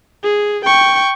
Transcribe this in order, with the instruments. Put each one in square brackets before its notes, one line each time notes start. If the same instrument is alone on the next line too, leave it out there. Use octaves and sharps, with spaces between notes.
[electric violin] G#4
G5 C#6